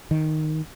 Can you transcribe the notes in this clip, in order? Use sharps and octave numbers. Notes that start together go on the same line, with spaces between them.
D#3